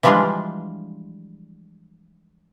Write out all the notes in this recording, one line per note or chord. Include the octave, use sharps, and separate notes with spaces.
E3 F3 G3 G#3 D4 F4